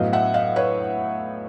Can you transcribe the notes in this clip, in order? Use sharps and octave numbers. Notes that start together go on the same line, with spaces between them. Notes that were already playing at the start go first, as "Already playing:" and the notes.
Already playing: A2 F#3 B3 D#5 F5
E5 F#5
D#5 F5
B4 C#5